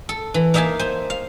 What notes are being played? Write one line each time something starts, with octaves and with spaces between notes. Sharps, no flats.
A4
E3
A#3 D#4 E5 F5 G#5 A5
C5 G#5
F5